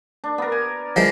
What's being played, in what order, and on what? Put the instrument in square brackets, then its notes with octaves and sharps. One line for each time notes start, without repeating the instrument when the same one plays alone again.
[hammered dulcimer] D4
B3 A#4
G#5
[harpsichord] F3 G#3 A#3